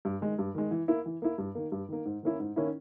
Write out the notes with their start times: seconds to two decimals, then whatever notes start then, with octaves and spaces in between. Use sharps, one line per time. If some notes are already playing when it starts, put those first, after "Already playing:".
0.05 G2
0.21 D#3 G#3
0.39 G2
0.55 D#3 G#3
0.71 E3
0.88 A#3 E4
1.06 E3
1.22 A#3 E4
1.38 G2
1.55 D#3 A#3
1.72 G2
1.89 D#3 A#3
2.05 G#2
2.23 D#3 A#3 C#4 E4
2.40 G#2
2.56 D#3 A#3 C#4 E4